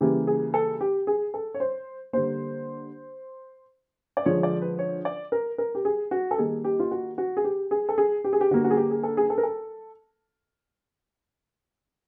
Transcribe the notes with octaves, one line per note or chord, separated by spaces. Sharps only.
C#3 E3 G3 A#3 G4
G#4
A4
G4
G#4
A4
C#5
C5
D3 G3 A#3 C5
D5
D3 F3 G#3 C#5
D5
B4
C#5
D5
A#4
A#4
G4
G#4
F#4
A4
D#3 G3 A#3 G#4
G4
F4
F#4
F#4
G#4
G4
G#4
A4
G#4
G4
G#4
G4
D3 G3 A#3 F#4
F#4
G#4
G4
G#4
A4
G#4
A4
A#4
A4